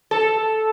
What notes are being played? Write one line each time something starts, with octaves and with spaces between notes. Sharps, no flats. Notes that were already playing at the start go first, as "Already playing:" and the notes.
A4